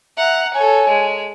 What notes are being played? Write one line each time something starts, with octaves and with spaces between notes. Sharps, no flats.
E5 F#5 A#5
A4 C#5 G#5
G#3